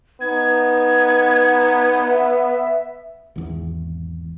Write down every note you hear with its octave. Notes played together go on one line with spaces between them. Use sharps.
B3 D#4 G#6
E5
G#1 E2